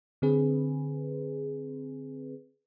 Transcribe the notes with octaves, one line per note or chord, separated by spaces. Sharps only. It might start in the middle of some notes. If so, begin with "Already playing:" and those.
D3 C4 G#4 B4